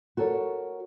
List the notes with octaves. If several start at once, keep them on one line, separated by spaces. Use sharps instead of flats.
F#4 A4 A#4 C#5